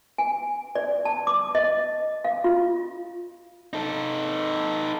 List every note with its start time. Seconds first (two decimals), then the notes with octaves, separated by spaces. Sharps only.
0.18 G#5
0.75 D5
1.05 A5
1.27 D6
1.55 D#5
2.25 F5
2.44 F4
3.73 D#4 A4